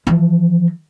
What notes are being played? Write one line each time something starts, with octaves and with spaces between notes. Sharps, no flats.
E3 F3